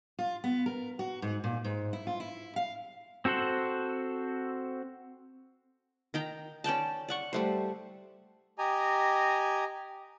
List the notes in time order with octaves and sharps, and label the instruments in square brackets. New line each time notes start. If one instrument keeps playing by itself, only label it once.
[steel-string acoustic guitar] F4
B3
A#4
F#4
G#2
A#2
G#2
E4
F4
E4
F5
[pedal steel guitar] C4 F#4 A4 C5 F#5
[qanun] D#3 G5 A#5
C#4 D5 G5 A5
D5 F#5 C#6
G3 A3 C5
[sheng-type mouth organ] G4 D#5 G#5 A#5